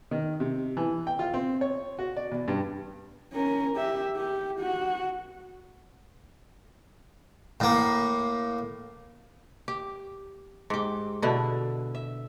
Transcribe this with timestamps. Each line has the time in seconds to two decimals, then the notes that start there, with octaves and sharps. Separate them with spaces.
0.11 D#3
0.40 C3
0.77 E3
1.07 G5
1.19 F4
1.34 C4
1.61 C#5
1.99 F#4
2.17 D5
2.32 E2
2.48 G2
3.33 C#4 A#4
3.77 G4 E5
4.16 G4
4.60 F#4
7.60 A2 A#3
9.68 G4
10.70 G#2 G4
11.22 B2 D3 E4
11.95 E5